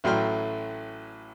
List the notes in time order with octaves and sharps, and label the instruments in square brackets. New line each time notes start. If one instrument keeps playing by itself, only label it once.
[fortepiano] A1 A2 F#3 G5 C6 F6